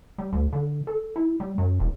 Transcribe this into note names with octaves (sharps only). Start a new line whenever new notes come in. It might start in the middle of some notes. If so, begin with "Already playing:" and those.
G3
D2
D3
A4
E4
G3
F#2
E1